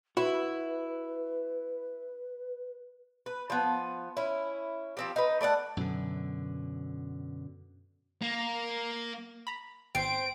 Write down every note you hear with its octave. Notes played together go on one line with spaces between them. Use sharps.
E4 F#4 B4
B4
F3 B3
C#4 E4
F3 C4 G4
D#4 B4
A3 D5 D#5 F#5
F#2 B2 D3
A#3
A#5 B5
G#1 C4 D7